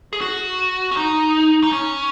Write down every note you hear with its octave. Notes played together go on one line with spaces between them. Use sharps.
G#4
F#4
C#4
D#4
D#4
C#4